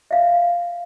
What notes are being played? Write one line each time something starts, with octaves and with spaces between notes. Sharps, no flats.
E5 F5